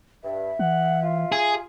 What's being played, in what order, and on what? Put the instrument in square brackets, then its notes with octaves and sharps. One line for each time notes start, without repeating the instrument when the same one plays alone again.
[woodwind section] G2 [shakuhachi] E5
[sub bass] E3 [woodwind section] F#5
[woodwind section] F4
[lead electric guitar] G#4